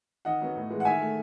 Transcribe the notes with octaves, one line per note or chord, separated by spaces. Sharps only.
D#3 D#5 F#5
F#3 B3
A2
E3 G#3
F#5
D#3 E5 G#5
A3